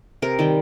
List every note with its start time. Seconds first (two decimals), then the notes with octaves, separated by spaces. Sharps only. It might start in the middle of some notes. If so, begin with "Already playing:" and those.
0.22 C3 A#4
0.39 D#3 G3